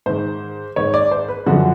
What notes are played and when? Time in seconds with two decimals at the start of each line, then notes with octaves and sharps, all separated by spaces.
0.06 G#2 D#3 C5
0.76 G#2 D#3 C#5
0.94 D5
1.11 C5
1.28 B4
1.46 F#2 D3 F3 F#4